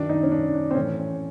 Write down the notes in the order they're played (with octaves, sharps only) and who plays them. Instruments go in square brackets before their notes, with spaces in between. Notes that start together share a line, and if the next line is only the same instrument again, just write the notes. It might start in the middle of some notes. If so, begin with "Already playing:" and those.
Already playing: [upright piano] F#2 D#3 D4
D#4
C#4
D4
D4
C4
A2 E3 C#4